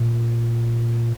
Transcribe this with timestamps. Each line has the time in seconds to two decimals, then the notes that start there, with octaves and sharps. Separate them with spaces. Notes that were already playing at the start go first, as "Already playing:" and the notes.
Already playing: A#2